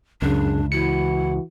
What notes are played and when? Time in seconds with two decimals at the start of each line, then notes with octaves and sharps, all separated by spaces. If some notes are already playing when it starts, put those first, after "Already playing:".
0.22 C#2 F#2 C#3 D4
0.72 E3 E4 F#4 C#7